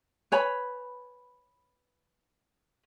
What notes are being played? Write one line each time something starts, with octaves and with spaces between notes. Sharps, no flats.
B4 C#5 G#5 B5